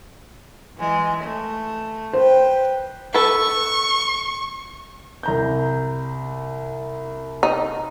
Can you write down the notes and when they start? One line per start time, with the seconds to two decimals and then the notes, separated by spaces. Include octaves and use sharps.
0.77 E3 G#3
1.23 A3
2.13 B4 C5 G5
3.14 A4 B4 C#6
5.23 C2 A#5 G6
7.43 D#4